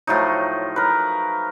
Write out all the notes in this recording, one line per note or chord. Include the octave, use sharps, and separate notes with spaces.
A2 F3 F#3 D#4
A#4 B4